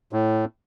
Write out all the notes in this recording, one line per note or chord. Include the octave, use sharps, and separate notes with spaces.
A2